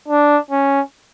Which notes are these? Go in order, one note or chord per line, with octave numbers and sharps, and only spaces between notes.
D4
C#4